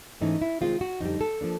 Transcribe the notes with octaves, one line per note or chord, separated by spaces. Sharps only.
G#2 E3 A3 C#4 D#4
E4
C3 D#3 G#3 C4 F4
F#4
F2 D3 G3 D#4
A4
F3 A#3 D4